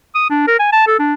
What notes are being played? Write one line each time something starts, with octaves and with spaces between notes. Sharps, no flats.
D#6
D4
A#4
G#5
A5
A4
D4